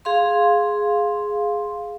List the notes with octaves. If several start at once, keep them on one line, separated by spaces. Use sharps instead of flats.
G#4 F5 C6